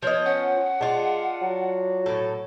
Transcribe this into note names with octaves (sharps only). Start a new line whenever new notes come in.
F3 B3 C#5 D#5
C#4 F#5
G#3 D4 F4
F#3
A2 A4